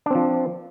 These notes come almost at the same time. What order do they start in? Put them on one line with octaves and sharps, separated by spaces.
D4 C4 F3